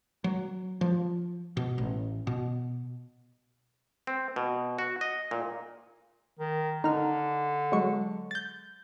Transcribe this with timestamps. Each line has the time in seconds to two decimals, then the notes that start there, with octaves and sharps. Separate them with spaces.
0.24 F#3
0.81 F3
1.57 B2
1.78 A1
2.27 B2
4.07 C4
4.36 B2
4.79 F#4
5.01 D#5
5.31 A#2
6.39 D#3
6.84 D3 D#4 F6
7.72 F#3 G#3 C#6
8.31 G6 A6